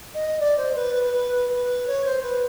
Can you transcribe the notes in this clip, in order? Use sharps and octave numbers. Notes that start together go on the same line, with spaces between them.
D#5
D5
C5
B4
B4
B4
B4
C#5
C5
B4